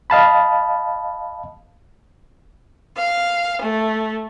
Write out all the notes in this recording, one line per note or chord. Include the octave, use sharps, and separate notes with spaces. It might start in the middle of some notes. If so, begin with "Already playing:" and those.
D#5 F5 A5 B5
F5
A3